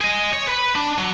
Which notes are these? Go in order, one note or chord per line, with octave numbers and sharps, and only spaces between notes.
G#4 D#5
C#5
B4 B5
D4
F#3